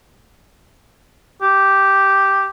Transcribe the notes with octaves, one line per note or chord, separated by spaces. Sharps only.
G4